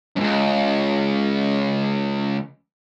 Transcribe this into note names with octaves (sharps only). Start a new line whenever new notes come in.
C#2 F#2